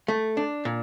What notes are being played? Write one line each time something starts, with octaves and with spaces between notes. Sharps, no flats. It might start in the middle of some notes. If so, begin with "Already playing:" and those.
A3
D4
A#2